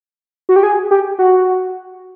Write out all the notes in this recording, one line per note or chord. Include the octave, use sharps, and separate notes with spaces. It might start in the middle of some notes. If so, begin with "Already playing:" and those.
F#4
G4
G#4
G4
F#4